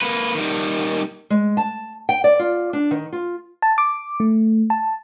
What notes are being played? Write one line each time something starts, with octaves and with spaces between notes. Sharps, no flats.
A#3 B4
D#3 G3
G#3
A5
G5
D5
F4
D4
D#3
F4
A5
D6
A3
A5